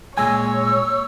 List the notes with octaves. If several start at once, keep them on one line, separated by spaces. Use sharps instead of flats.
A#2 G#3 C#5 G#5 E6